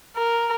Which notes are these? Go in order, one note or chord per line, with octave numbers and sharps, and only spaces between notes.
A#4